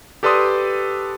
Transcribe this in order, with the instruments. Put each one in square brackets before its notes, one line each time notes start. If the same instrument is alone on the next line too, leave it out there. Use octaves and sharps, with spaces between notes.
[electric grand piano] G4 A4 B4 D5 C6 D#6